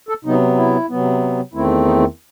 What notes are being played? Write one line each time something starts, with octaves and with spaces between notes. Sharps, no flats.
A4
C3 F#3 B3 D#4
E4
C3 F#3 B3
E2 D#3 A3 C4 E4
D#4